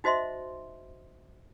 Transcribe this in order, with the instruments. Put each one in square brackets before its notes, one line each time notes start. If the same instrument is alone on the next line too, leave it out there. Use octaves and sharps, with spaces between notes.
[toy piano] D#4 F#4 C5 D#5 E5 C6